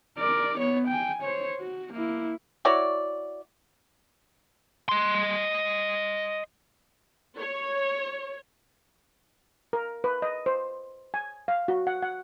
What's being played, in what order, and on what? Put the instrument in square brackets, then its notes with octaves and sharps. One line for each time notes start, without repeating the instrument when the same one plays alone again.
[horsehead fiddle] A#4 D5
B3 C#5
G5 G#5
C5 C#5
F#4
A#3 E4
[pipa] E4 F#4 C#5 D5
[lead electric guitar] D#5 C6
[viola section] C#5
[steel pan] A#4
B4
D#5
C5
G#5
F5
F#4
F#5
F#5